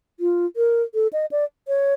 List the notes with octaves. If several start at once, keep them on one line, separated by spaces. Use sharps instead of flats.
F4
A#4
A4
D#5
D5
C#5